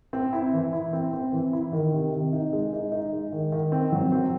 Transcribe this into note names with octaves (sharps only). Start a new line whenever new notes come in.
C4
E4
E3
E4
C4
C4
E3
E4
D#3
C3
D#3
D#4
G#3
D#4
D#4
G#3
D#3
D#3
C4
F#3
C4